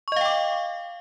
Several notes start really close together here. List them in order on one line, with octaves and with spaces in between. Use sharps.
C#6 D#5 F5 G5 D6